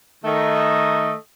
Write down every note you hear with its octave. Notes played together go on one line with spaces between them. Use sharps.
D#3 A3 D#5